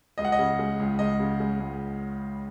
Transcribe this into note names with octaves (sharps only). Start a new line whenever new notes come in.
C#2 D#5
F#5
D#5
C#3
G#3
C#2
C#2 D#5
C#3
G#3
C#2